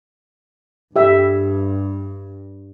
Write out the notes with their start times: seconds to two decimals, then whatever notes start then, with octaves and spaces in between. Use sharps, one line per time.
0.96 G2 G4 E5